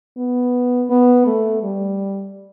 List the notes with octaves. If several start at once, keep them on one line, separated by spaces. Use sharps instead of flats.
B3
B3
A3
G3